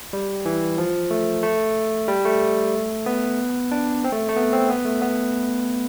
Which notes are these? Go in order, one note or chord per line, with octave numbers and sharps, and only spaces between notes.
G3
E3
F3
A3
A3
G3
A3
B3
D4
C4
A3
A3
B3
C4
B3
A3
B3